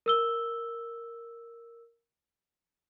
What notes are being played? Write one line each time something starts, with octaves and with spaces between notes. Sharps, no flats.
A#4 E6 G7